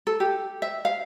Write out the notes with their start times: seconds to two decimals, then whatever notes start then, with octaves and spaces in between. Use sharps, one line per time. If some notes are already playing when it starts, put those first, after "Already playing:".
0.07 A4
0.20 G4
0.62 E5
0.85 F5